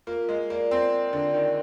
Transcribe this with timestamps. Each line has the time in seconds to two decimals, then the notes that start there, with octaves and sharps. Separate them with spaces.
0.07 A#3 F4
0.29 G#3
0.50 A#3 D5
0.71 C4
0.93 D5
1.13 D3
1.34 D#3 D5